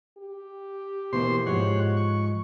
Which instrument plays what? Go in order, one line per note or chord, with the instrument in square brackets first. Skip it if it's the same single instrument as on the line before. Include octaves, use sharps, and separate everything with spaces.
[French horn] G4
[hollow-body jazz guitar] B2 E3 A#3 [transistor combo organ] C5 C6
[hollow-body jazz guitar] G#2 F3 G#3 [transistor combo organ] C#5 F#5
[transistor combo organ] C#6